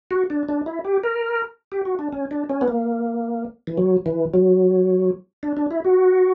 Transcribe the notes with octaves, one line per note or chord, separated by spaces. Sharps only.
F#4
D4
D4
E4
G4
A#4
G4
F#4
D4
C#4
D4
C#4
B3
A#3
E3
F#3
E3
F#3
D4
D4
E4
F#4